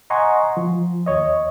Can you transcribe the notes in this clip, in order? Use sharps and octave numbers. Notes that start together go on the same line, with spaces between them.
D#5 F#5 G#5 A#5 C6 C#6
F3
D#2 C#5 D#5